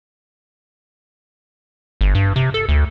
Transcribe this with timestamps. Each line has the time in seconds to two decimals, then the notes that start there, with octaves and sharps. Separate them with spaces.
2.01 G1
2.15 G2
2.36 C3
2.54 A4
2.69 D2